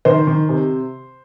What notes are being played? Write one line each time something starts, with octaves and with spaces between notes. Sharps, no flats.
D#3 C5
D#3
C3